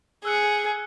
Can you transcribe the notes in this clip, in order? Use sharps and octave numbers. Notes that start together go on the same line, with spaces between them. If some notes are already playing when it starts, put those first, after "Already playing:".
G#4 E6 F#6 C#7